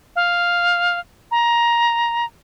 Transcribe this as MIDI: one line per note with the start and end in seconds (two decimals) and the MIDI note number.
0.16 0.99 77
1.31 2.25 82